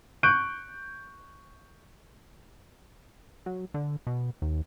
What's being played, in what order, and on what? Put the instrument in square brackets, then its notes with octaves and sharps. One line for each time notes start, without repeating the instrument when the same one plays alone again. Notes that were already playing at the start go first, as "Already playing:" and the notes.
[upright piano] C#6 F#6 G6 D7
[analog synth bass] F#3
D3
B2
D#2